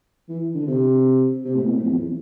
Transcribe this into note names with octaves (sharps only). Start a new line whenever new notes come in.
E3
D3
C3
C3
A2
B2
A2
F2
E2